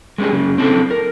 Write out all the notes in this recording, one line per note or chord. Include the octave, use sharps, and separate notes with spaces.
G#3 A3 C#4 G4 G#4
F#2 C#3 F#3
C4 D4 E4 G4 A4 C5
A#4